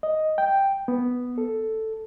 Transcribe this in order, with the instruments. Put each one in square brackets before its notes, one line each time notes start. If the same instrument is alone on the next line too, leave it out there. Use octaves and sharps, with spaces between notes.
[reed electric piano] D#5
G5
B3
A4